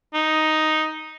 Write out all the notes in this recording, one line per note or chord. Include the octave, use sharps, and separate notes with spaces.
D#4